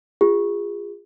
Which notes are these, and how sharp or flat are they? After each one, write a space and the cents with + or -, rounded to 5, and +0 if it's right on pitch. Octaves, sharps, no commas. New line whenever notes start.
F4 +0 G#4 -25